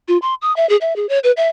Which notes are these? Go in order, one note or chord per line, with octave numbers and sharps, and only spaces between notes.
F4
C6
D#6
E5
G#4
E5
G#4
C#5
B4
E5